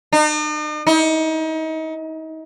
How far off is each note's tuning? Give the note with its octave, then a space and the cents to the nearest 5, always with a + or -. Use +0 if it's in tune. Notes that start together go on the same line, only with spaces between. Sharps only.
D#4 -45
D#4 +35